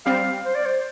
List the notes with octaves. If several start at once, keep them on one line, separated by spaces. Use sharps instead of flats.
G3 C4 F5
C5
D5
C5